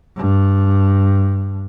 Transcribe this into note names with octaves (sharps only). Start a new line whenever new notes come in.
G2